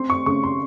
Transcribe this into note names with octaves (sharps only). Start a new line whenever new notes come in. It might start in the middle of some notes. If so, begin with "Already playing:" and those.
Already playing: C4 C6
C#6
C#3 C#6
C6